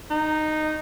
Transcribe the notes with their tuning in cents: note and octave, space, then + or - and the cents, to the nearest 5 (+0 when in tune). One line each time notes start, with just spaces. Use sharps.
D#4 -10